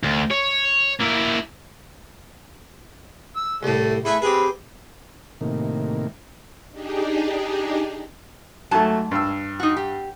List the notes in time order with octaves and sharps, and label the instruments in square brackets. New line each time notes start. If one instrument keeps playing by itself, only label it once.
[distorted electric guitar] D2
C#5
A#3 E4
[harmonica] E6
[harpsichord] C2 A2 [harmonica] A3
[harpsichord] A3 B4 E5 [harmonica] E4 G#4
[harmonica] C4 B4 [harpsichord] G4 G#4
[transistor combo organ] A2 C3 D#3 A#3
[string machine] D4 D#4 G4 G#4
[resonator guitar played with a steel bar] G#2 A5 [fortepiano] F#3 A3
[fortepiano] G2 E6
[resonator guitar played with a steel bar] D#4 F#4
G4